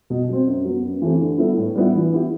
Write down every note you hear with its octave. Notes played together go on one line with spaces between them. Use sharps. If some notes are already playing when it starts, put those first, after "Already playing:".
B2
F#3 C4
F#2
F#3 B3
F#2
E3 A3 C4 G4
D3
G3 B3 E4 A4
A2
G3 B3 E4
E3
B3 E4 G4